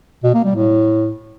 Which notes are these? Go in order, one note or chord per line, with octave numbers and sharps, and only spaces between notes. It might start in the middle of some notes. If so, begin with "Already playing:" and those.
B2
A#3
G3
A2